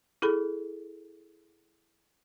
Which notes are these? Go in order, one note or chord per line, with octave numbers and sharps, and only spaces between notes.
E4 G#4 A4 B5